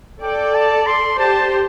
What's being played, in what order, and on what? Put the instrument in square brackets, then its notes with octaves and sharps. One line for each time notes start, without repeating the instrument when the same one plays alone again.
[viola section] A4 D5 [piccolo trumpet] G5
[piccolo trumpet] A5
C6
[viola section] G4 C5 [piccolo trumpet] A5